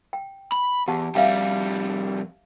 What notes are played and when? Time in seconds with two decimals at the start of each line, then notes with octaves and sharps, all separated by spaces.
0.13 G5
0.52 B5
0.88 E2 G4 F#5 A5
1.15 F2 G3 E5 F5 G5